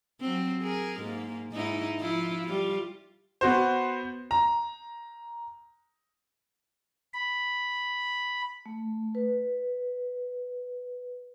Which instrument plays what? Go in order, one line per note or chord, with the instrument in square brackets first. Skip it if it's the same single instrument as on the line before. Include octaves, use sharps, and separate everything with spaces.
[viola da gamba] F#3 C4
G#4 A#4
G#2 A#3
G#2 D#4 E4
F3 E4 F4
G3 F4
[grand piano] B3 F#4 C5
A#5
[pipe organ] B5
[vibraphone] A3
B4